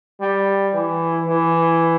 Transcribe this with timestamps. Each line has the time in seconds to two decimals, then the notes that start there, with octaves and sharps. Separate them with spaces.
0.20 G3
0.74 E3
1.27 E3